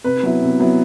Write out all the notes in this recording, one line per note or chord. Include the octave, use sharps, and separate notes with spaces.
C3 B4
F#3 B3 E4
C3
F#3 B3 E4